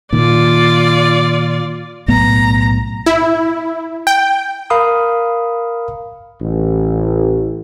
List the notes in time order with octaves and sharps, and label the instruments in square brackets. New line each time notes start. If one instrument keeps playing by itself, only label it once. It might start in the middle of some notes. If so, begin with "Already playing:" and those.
[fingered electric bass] A#2 D#3 [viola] F4 D5
[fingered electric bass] B1 A2 B3 [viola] A#5
[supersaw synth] E4
G5
[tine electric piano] A#4 F5 B5 D#6
[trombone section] A1